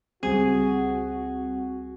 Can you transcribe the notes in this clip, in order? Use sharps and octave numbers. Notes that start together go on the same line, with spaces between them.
C#2 G3 C4 F#4 G#4